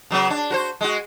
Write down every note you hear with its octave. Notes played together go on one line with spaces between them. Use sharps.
C#3 F#3 B3
D4
F#4 A#4 C5
G#3 F#4